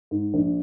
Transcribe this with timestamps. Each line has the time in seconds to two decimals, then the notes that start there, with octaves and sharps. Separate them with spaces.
0.11 G#2
0.34 A#1